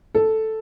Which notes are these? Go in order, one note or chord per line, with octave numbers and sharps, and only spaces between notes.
A4